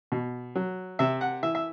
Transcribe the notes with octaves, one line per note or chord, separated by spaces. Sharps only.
B2
F#3
C3 E5
F#5
E3 E5
E5